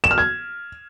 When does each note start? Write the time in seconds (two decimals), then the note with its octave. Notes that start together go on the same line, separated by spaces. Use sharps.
0.04 E7
0.11 F6
0.18 G#6